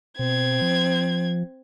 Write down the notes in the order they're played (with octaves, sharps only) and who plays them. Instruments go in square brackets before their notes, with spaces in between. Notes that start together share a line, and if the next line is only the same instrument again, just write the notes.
[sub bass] B2 [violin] C4 G#6
[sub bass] F3